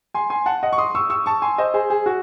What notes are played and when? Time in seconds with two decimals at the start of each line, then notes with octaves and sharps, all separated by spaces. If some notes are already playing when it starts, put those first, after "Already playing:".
0.14 G#5 C6
0.30 G#5 C6
0.46 F#5 A5
0.63 D#5 F#5
0.73 C#6
0.78 C6 D#6
0.95 C#6 E6
1.10 C#6 E6
1.26 A5 C#6
1.42 G#5 C6
1.58 C5 D#5
1.74 G#4 C5
1.90 G#4
2.06 F#4